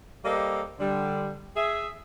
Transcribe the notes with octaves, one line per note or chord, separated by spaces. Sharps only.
G3 A#3 A4 C5 D#5
D3 G3
G#4 E5